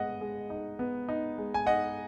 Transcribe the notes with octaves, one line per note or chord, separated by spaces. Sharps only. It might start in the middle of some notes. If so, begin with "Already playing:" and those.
Already playing: G#3 B3 D#5 F#5
G#3
D#4
B3
D#4
G#3
G#5
D#4 D#5 F#5